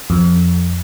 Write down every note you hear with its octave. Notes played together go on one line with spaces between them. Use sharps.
F2